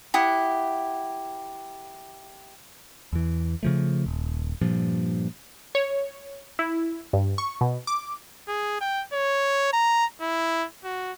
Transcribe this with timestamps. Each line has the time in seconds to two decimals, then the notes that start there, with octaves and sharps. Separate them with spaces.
0.14 E4 G4 F#5 D#6
3.13 E2 E3
3.63 C#3 F3 A3
4.06 D#1
4.62 G2 A#2 F3
5.75 C#5
6.59 E4
7.13 G2
7.38 C#6
7.61 B2
7.87 D6
8.48 G#4
8.81 G5
9.13 C#5
9.73 A#5
10.21 E4
10.84 F#4